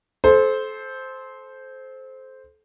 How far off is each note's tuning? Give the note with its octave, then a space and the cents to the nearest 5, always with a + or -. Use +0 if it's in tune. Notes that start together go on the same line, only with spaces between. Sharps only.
A4 -30 C5 +0